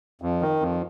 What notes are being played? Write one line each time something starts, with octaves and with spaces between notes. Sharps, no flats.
F2
D#3
F2